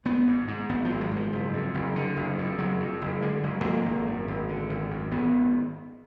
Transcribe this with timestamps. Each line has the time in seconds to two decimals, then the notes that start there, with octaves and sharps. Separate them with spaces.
0.05 G#1 B3
0.27 G#2
0.48 G#2
0.69 G#1 B3
0.85 F3
0.90 G#1
1.01 F#3
1.11 G#2
1.16 F3
1.33 F#1
1.53 F2
1.74 F#1
1.96 D3
2.17 F#1
2.38 F2
2.58 F#1 F#3
2.80 F2
3.01 F#1
3.22 D3 G#3
3.43 F#1 G#3
3.64 F2 A#3
3.86 G#1
4.06 F#2
4.28 G#1
4.49 D3
4.70 G#1
4.91 F#2
5.11 G#1 B3